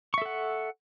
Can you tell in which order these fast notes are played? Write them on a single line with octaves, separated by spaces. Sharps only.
C#6 E5 A4 F#5